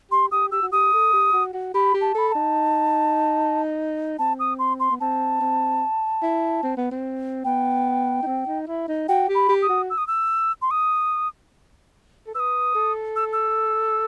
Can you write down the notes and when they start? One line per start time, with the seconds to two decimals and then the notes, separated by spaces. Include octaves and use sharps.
0.11 G4 C6
0.31 G4 D#6
0.52 G4 E6
0.62 F#4
0.72 G4 D#6
0.93 A4
1.13 G4
1.33 F#4
1.54 F#4
1.74 G4 B5
1.94 G4
2.01 A5
2.15 A4 B5
2.28 B5
2.32 D#4 A5
4.19 C4 A5
4.39 D#6
4.59 C6
4.80 C6
4.91 B3
5.01 C4 A5
5.41 C4
6.22 E4
6.63 C4
6.77 B3
6.91 C4
7.44 B3 G5
8.22 D#4
8.26 C4
8.47 D#4
8.67 E4
8.88 D#4
9.09 F#4 G5
9.28 G4
9.35 B5
9.49 G4
9.62 D#6
9.69 F#4
9.90 E6
9.98 D#6
10.07 E6
10.62 C6
10.71 D#6
12.27 A4
12.35 B4 E6
12.40 D#6
12.75 A4
13.16 E6
13.33 E6